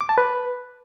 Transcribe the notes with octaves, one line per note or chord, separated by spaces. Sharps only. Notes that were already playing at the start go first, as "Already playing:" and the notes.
D6
A5
B4